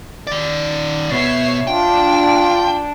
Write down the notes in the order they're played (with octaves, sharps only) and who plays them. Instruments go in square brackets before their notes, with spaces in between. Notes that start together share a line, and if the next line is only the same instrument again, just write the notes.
[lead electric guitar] D#3 D5
[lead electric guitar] B2 B3 [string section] C#5 E5 C7
[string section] D4 [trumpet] F4 [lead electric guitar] G5